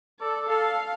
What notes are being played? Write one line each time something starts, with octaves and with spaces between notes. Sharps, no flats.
A4 D5
A4 F5